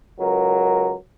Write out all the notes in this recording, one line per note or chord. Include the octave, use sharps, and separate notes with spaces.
C#2 F#3 A#4